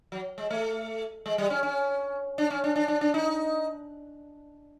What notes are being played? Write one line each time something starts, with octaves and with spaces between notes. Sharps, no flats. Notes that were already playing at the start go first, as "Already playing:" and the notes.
F#3
G#3
A3
G#3
G3
C#4
C#4
D4
C#4
D4
D4
D4
D4
D#4